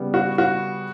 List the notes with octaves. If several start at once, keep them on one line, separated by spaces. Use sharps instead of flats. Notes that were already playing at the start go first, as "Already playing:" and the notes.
Already playing: C#3 G3 B3
F#4
F#4